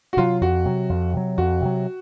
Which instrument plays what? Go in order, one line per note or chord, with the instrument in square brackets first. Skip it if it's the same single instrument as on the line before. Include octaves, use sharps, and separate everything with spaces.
[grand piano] F#4
[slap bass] C3 F#3 [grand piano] F4
[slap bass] F2 [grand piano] F#4
[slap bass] C3 F#3
F2
C3 F#3
[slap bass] F2 [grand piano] F#4
[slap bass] C3 F#3